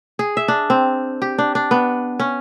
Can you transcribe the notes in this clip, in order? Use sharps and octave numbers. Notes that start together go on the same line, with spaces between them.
G#4
E5
D4
C4
G4
D4
D4
B3
C#4